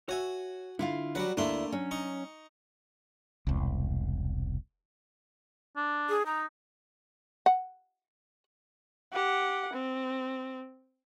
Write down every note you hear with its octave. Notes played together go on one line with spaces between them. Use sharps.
F#4 C#5 E5 G#5
D3 E4 F4 F5
F#3 G3 F#4 B4 F#5
D2 A3 A#3 D4 E4 E5 C6
F#3 C#4
D#4 C#6
E1 C2
D4
G#4
D#4 A#5
F#5
G4 F#5
C4